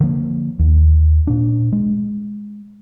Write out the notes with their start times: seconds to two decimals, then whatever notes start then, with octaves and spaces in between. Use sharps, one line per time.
0.01 D3 F3 A#3
0.59 D#2
1.27 A#2 D4
1.72 G#3